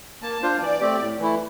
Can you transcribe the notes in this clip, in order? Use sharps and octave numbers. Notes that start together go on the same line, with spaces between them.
A#3 A5
D4 F4 C5
E3 D5
A3 C4 G4
A2
E3 A3 E4